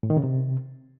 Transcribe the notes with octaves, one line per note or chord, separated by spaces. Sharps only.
A2
D#3
C#3
C3